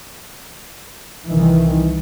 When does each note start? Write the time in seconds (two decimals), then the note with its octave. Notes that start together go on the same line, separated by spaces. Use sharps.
1.27 C2 D#3 E3